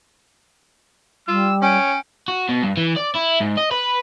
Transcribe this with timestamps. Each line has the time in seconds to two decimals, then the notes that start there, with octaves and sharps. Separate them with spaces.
1.28 G3 F4 E6
1.62 C#4 C#5 G5 D7
2.28 F#4
2.49 B2
2.63 G2
2.77 E3
2.96 D5
3.15 E4
3.40 G#2
3.57 D#5
3.71 B4